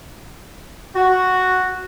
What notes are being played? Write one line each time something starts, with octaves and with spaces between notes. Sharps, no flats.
F#4